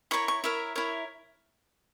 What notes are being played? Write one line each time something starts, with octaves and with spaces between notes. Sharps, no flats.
E4 A#4 C#5 C#6
C#6
E4 A#4 C#5 E5
E4 A#4 C#5